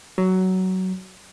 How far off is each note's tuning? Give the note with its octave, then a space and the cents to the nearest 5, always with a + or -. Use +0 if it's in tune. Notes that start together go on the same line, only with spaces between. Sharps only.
F#3 +15